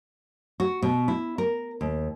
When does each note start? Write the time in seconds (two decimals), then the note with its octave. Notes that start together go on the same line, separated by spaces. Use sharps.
0.60 F#4
0.82 B2
1.08 E4
1.38 A#4
1.81 D#2